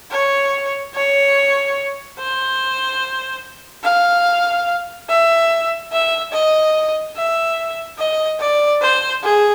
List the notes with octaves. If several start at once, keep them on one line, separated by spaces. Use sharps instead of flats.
C#5
C#5
C5
F5
E5
E5
D#5
E5
D#5
D5
C5
G#4